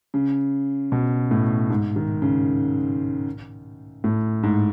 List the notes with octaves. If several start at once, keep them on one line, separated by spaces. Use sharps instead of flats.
C#3
B2
A2
G#2
D#3
C#3
A2
G#2